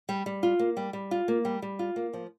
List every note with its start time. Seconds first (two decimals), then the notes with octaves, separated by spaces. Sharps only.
0.09 G3
0.26 G3
0.43 F4
0.59 A#3
0.77 G3
0.93 G3
1.11 F4
1.28 A#3
1.45 G3
1.62 G3
1.79 F4
1.96 A#3
2.13 F3